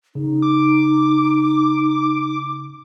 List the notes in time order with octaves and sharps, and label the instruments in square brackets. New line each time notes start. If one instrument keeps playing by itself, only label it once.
[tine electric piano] C#3 [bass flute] D#4
[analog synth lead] D6